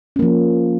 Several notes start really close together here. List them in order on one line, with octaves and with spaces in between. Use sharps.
C#4 A#3 F3